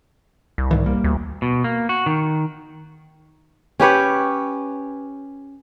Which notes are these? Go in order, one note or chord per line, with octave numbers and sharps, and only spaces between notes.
C2
G#2 D#3 E3
D#1 G3 A#3
D2
B2
A#3
F#4
D#3
C#4 G4 B4 C#5